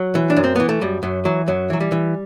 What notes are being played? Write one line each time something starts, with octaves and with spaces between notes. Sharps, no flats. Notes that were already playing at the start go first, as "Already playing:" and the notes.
Already playing: F#3
E3
D4
F#2
C4
E3 B3
A3
F#2 G3
F#2 F#3
E3 F#3
F#2 F#3
E3 F#3
G3
E3